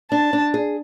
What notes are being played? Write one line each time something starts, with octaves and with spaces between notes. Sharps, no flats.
D4 A5
D4
G#4